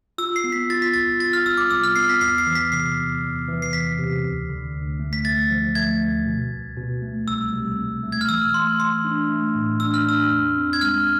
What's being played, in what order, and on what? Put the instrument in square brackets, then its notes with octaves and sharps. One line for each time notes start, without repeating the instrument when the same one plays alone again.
[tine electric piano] F4 [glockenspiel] E6
[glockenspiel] C7
[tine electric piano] B3
[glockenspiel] B6
[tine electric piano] F4 [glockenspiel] A6
[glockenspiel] B6
[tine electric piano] C2 [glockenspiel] A6
[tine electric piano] F4 [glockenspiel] A6
[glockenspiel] F6
[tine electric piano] C2 [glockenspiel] E6
[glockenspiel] D6
[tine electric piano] C2 [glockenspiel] E6
[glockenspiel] F6
[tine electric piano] B3 [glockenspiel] C7
[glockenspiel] B6
[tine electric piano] E2 [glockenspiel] C7
[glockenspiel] C7
[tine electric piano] E3
[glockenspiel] B6
[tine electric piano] C3 [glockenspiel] C7
[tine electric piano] E2
E2
E3
[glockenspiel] C7
[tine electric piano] E2 [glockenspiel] B6
[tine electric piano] C3
D2
D3
D2
A3
[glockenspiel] B6
[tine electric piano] A3 [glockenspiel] A6
[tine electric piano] F3
[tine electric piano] A3 [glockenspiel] G#6
[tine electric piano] D2
B2
C2
B2
A3
[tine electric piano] C2 [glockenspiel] E6
[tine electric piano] C2
C2
A3
[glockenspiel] G#6
F6
[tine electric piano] E3 [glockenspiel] E6
[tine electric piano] A3 [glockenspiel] C6
[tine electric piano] E3 [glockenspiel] C6
[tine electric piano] D4
A3
A2
[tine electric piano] D4 [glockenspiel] E6
[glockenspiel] F6
[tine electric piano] D4 [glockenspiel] E6
[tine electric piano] E2
C4
[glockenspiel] G#6
[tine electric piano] G#3 [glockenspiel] F6